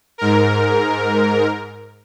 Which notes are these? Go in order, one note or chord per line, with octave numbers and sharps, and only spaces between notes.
G#2 A#4